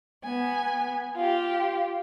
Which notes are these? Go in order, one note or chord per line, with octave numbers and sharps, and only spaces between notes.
B3 G#5
F4 G4